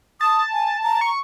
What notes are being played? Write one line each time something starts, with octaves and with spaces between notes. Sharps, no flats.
A5 D#6
G#5
A#5
C#6